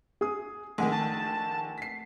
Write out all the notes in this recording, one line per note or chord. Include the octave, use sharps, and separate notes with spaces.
G#4 D#6
A#1 D#3 G#3 A3 F#5 G#5
A5
B6 C7